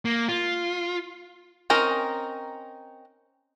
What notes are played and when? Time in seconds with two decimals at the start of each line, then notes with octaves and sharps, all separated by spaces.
0.05 A#3
0.29 F4
1.70 C4 C#4 D#4 A#4